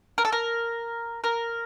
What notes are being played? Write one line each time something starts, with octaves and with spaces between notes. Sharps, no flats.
A#4
A4
A#4
A#4